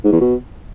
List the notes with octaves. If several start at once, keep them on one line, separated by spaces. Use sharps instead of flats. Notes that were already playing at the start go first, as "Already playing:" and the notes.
G#2
E2
B2